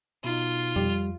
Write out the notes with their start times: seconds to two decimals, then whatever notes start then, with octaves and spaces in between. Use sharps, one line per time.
0.24 B2 D#4 F4
0.76 F2 G3